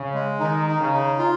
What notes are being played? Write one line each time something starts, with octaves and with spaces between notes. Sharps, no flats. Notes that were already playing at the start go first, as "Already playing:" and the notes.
Already playing: C#3
G#3
D#3 D#4
D#4
C#3
D#4
F4